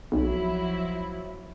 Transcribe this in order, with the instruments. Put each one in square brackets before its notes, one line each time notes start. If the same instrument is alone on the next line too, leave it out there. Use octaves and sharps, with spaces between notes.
[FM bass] B1 [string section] F3 F#3 E4